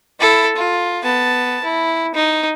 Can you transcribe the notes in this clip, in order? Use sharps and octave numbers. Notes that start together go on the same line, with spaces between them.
E4 A4
F4
B3 A5
E4
D#4